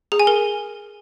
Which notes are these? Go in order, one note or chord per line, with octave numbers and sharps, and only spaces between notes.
G#4
G#5
A#4